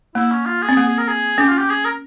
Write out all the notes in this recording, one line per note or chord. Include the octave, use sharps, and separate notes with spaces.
A#3 E4
C#4
F4
G#4
C4
A#3 G#4
G#4
A#4
G#4
C#4 G4
F4
G4
G#4
A#4